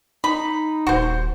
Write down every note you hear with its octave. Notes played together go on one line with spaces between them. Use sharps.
D#4 B5
D#1 F#4 C5